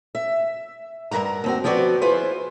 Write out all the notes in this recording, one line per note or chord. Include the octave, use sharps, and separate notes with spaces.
E5
G2 B2 A#4 F#5 A#5
D#2 C4 F#4
F3 B3 C4 F#4 C#5 D5
E4 F4 G#4 B4 C5